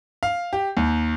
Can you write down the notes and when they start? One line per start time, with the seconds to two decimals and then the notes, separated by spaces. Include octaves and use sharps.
0.23 F5
0.53 G4
0.77 D#2